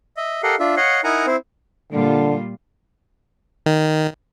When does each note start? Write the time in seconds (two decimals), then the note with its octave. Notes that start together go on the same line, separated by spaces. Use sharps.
0.17 D#5 E5
0.43 G4 A4 A#4 D#5 F5 F#5
0.59 D4 F4 E5
0.77 C#5 D#5 F5 F#5
1.04 D#4 E4 A#4 F#5 G#5 A#5
1.27 C4 E4 C5
1.92 A#2 D3 G3 F4
3.66 D#3